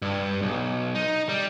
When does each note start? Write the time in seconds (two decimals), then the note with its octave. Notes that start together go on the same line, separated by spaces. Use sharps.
0.02 G2
0.42 B1
0.95 D#4
1.29 G3